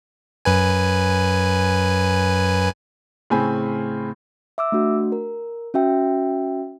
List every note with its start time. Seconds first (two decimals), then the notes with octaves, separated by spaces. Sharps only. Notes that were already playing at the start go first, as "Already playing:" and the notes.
0.45 F#2 B4 G#5
3.30 A2 C#3 C4 G#5 B5
4.58 E5 D6 E6
4.72 A3 D4 F#4
5.12 A#4
5.74 C#4 F#4 E5 G5